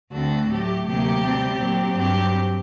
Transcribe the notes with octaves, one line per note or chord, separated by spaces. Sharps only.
D2 D3 A3 C4 F#4 A4
A2 F#3 A3 G4
D2 C3 F#3 A#3 G4
C3 G3 C4
A#2 F#3 C4
G2 F#3 C4 G4